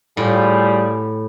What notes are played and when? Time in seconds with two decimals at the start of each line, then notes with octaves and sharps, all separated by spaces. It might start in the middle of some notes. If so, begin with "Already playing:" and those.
0.17 A2 G3 F4 G#4